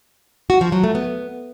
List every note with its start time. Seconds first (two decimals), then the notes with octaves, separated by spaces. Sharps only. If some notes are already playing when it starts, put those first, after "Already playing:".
0.50 F#4
0.61 F3
0.72 F#3
0.84 A3
0.95 B3